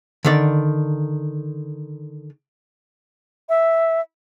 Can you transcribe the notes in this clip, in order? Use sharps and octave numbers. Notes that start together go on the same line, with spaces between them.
D3 D#3 D5
E5